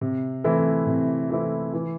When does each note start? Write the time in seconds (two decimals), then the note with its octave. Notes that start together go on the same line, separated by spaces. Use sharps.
0.01 C3
0.44 E3 A3 C4 E4
0.87 C3
1.30 E3 A3 C4 E4
1.73 E3